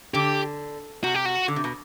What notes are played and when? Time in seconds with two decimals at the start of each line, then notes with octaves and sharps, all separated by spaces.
0.14 D3 G4
1.04 C3 F#4
1.15 G4
1.25 F#4
1.48 D3
1.56 C3
1.64 B2